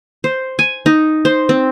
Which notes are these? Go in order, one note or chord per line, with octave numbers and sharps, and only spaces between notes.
C5
G#5
D#4
C5
C4